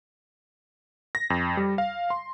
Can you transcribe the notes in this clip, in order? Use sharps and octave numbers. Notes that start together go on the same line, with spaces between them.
A#6
F2
G3
F5
C6